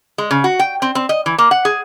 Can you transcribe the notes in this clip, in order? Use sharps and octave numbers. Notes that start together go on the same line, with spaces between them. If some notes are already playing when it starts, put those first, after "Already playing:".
G#3
C#3
F#4
G5
C4
C4
D#5
E3
A#3
F#5
G#4